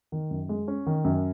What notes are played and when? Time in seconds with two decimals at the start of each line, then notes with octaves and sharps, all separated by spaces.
0.12 D#3
0.31 F#2
0.49 G#3
0.68 C#4
0.87 D#3
1.04 F#2